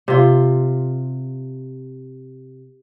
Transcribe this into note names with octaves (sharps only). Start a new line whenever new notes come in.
C3 F4